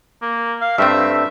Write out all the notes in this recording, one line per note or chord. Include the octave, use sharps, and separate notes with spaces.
A#3
F5
G2 A3 C4 E5